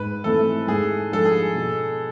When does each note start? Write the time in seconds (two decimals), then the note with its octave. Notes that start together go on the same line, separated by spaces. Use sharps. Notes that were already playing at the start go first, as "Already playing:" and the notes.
Already playing: G#2 B4
0.24 E3 A3 C4 E4 A4
0.68 G#2 G#4
1.12 F3 G#3 D4 A4
1.25 G#4
1.55 B2